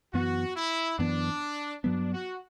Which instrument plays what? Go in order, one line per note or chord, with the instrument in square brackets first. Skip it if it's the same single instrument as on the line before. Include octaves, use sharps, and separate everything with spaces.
[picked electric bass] F#2 E3 B3 [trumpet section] F#4
[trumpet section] E4
[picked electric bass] F#2 E3 B3 [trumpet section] D4
[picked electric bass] G2 F#3 B3 [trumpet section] D4
[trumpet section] F#4